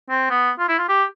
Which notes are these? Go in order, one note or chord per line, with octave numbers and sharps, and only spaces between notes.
C4
B3
F4
E4
F4
G4